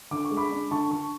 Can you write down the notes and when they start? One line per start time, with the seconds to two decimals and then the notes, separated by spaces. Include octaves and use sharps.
0.11 D3 D6
0.25 C#6
0.31 G#3
0.37 B5 D6
0.51 D4
0.71 D3 A5 C#6
0.91 D3 A5 C#6